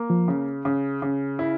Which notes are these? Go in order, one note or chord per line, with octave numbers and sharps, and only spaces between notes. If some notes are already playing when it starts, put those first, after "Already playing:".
Already playing: A#3
F3
C#3
C#3
C#3
E4